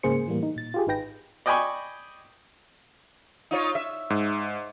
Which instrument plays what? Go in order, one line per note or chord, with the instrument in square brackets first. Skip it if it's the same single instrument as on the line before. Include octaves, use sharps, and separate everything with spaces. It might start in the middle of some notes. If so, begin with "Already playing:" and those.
[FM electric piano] G#2 C#3 A#3 G#4 C5 C#7
A2 E3 G3 A#3
D#4
A#2 A6
F4 G4 G#4
G#1 D#4 B4 G5 A#6
[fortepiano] D5 D#5 G5 G#5 B5 C#6
[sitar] D#4 F4 C#5
E5
[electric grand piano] G#2